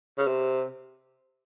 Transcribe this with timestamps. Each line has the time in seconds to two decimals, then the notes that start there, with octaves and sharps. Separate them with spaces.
0.18 C#3
0.27 C3